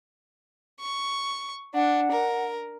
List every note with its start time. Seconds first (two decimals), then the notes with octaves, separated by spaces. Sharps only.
0.81 C#6
1.74 D4 F#5
2.11 A#4